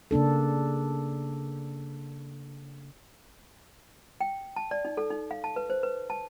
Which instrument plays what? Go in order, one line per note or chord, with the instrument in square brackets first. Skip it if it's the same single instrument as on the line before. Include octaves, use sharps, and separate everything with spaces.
[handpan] C#3 A#3 D4 A4
[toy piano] G5
A5
D5
D#4
A4
D#4
F5
A5
B4
C5
B4
A5